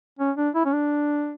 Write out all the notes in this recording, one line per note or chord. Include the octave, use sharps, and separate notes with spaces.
C#4
D4
E4
C#4
D4